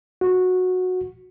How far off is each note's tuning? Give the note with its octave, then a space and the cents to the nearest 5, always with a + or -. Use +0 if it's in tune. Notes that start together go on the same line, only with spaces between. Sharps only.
F#4 -15